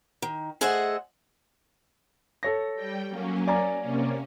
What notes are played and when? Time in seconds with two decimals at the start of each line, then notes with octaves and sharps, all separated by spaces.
0.22 D#3
0.61 A3 G#4 C5 D#5 E5 F#5
2.43 A4 C#5 A#6
2.75 G3 G5
3.09 F#3 A#3 C#4
3.48 D5 G#5 A#5
3.81 C3 A#3 C#4